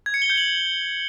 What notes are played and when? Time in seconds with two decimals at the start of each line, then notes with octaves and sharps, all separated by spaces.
0.06 G#6
0.14 C#7
0.22 G7
0.30 G6
0.37 F#7